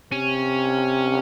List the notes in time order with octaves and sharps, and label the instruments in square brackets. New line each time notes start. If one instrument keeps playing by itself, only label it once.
[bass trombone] C3 [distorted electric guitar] C#4